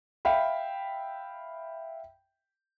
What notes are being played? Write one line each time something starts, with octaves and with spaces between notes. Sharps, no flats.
E5 F5 G5 B5